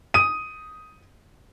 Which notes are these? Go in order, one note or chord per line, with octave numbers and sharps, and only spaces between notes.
D#6 D#7